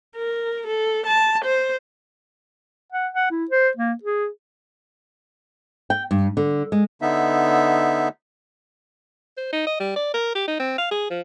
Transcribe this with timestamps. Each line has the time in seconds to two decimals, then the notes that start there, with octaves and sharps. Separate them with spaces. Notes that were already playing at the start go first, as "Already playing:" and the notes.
0.16 A#4
0.67 A4
1.06 A5
1.44 C5
2.93 F#5
3.14 F#5
3.31 E4
3.51 C5
3.77 A#3
4.03 G#4
5.90 G5
6.11 G2
6.37 D3
6.72 G#3
7.02 D3 B3 D#4 E5
9.37 C5
9.53 D#4
9.67 D#5
9.80 G3
9.96 D5
10.14 A#4
10.35 G4
10.48 D#4
10.60 C4
10.78 F5
10.91 G#4
11.10 F3